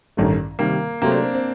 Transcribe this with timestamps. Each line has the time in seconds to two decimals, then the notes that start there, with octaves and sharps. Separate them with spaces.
0.17 A1 G2 D#3 A3
0.59 C3 D#3 G3 A#3
1.02 C3 F#3 A3 A#3 C4
1.12 D4
1.22 C4
1.34 C4